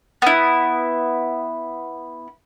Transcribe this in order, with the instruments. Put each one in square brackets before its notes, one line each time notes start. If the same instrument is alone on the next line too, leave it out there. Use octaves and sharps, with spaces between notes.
[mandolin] B3 E4